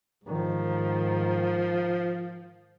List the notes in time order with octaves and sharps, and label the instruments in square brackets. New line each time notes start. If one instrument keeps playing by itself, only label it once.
[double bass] G#2 D#3 [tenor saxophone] F3